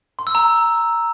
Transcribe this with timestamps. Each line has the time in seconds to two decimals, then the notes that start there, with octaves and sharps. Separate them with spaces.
0.19 C6
0.27 E6
0.35 A#5